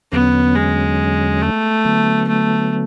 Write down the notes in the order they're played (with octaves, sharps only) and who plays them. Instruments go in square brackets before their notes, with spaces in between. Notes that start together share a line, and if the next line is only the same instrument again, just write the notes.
[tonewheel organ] E2 D3 F#3 C#4 [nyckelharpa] B3
[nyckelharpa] G#3
A3
[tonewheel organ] D3 F#3 B3
[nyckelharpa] A3